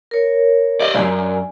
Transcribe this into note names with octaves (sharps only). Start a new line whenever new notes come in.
A#4 C#5
G4 D5 D#5
B1 F#2 D5 G#5